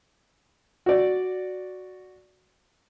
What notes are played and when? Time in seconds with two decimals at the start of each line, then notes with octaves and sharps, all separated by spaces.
0.86 F#4 D5